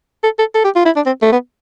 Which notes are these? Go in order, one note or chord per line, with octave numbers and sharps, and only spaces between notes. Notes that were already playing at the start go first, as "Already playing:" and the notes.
A4
A4
A4
G4
F4
E4
D4
C4
A3
B3